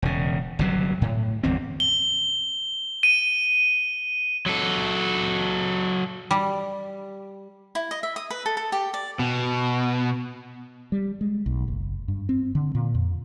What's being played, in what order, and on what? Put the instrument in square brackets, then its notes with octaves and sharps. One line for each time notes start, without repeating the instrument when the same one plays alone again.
[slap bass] E1 C#3
G1 C3 F#3
A2
G1 E2 C4
[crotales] G7
D#7
[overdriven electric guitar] F#3 A4
[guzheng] G3
[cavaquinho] E4
D#5
E5
D#6
B4
A4
A4
G4
D5
[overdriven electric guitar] B2
[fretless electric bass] G3
G#3
B1
F#1
G2
C4
D3
A#2
F2